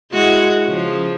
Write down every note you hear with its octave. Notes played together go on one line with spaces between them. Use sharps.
G#3 E4 F#4
C#3 F3